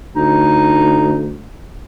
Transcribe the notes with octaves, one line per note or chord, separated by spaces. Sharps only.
D2 D#4